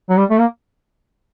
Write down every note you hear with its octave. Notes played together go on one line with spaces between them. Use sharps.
F#3
G3
A3
A#3